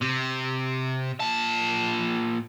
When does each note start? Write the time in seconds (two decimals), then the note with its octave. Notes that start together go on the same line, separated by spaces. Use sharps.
0.02 C3
1.20 A#2 A5